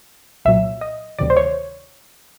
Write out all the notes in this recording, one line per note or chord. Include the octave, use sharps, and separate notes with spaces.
C2 A#2 F#3 E5
D#5
D2 C3 D#3 F#3 D5
C5
C#5